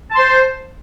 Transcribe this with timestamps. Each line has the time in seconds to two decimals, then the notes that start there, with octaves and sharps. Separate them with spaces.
0.10 A5
0.14 C6
0.17 C5